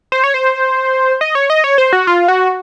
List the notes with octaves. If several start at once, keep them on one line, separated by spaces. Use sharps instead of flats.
C5
C#5
C5
D#5
C#5
D#5
C#5
C5
F#4
F4
F#4